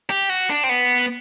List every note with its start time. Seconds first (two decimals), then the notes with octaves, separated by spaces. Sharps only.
0.10 G4
0.29 F#4
0.50 D4
0.63 C4
0.69 B3